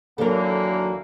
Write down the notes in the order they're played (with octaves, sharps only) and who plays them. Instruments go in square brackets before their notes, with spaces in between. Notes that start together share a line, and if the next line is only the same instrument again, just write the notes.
[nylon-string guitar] D#2 F#3 [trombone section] D3 E3 A#3 [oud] A4 A#4